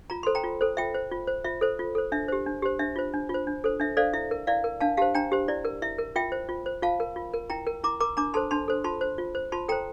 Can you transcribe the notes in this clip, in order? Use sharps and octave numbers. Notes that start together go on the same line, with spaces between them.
F4 A#5
A4 C5 C6
G5 A#5
F4
A4 C5
F4 E5 G5
C5
F4
C5
F4 E5
A4 C5
F4
A4 C5
D4 E5
G4 C5
D4
G4 C5
D4 E5
F4 C5
D4
F4 C5
D4
A4 C5
D4 E5
A4 C5 D5 F5
E4 E5
A#4
E4 D5 F5
A#4
D4 F5 A5
G4 C5 F5 A5
D4 G5 A#5
G4 C5
E4 D5
A#4
E4 E5
A#4
F4 E5 G5
C5
F4
C5
F4 F5 A5
A#4
F4
A#4
E4 G5 A#5
A#4
E4 A#5 D6
A#4 A#5 D6
D4 A#5 D6
A4 C5 A5 C6
D4 A5 C6
A4 C5
F4 A5 C6
C5
F4
C5
F4 A5 C6
A4 C5 G5 A#5